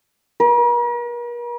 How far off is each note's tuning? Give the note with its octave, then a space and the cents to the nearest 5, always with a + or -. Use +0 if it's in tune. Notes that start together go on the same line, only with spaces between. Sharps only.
A#4 +45